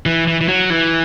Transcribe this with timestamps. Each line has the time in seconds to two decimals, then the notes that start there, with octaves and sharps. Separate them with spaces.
0.06 E3
0.27 E3
0.41 E3
0.48 F#3
0.70 E3